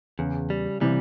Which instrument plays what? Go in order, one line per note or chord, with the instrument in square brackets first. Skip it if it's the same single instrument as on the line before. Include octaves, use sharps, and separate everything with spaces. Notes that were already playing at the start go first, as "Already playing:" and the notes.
[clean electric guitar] E2 [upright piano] C#3
[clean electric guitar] G3
[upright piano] C3 E3 [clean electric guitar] G3